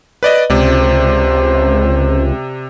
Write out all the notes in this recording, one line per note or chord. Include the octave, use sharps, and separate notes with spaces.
B4 D5 D#5
C#2 C3 C5 D5